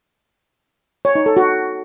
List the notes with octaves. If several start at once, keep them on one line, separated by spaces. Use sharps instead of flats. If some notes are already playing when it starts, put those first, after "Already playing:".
C#5
D#4
A4
F#4